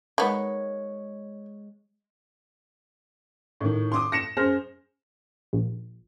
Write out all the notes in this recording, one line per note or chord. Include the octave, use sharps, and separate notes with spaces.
D#3 G#3 B3 C#5
A2 D#3
C6 D6 D#6
A#6 C#7 E7
F#2 G#4 C5 F6 A#6
A#1